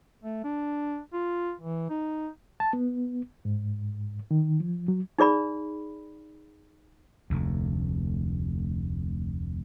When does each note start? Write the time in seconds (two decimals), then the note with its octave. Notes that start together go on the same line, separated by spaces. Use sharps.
0.24 A3
0.44 D4
1.13 F4
1.61 E3
1.90 D#4
2.60 A5
2.73 B3
3.45 G#2
4.31 D#3
4.60 F3
4.88 F#3
5.19 D#4 G#4 D5 B5
7.30 F1 D2